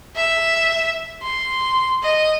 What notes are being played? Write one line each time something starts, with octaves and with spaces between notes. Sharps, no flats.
E5
C6
D#5